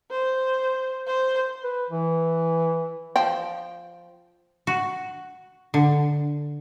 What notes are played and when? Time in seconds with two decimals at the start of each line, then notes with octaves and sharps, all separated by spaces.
0.11 C5
1.07 C5
1.64 B4
1.90 E3
3.16 F3 G5
4.67 F#4
5.74 D3